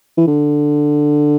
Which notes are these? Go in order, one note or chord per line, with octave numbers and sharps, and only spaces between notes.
E3
D3